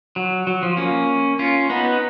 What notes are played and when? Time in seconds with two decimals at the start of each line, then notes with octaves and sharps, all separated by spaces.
0.16 F#3
0.47 F#3
0.63 F3
0.77 A#3 C#4
1.39 C#4 F4
1.70 B3 D#4